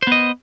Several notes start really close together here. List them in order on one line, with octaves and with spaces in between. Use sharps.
C5 B3 D#5